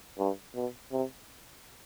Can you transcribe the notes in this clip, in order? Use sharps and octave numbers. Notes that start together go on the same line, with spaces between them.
G2
B2
C3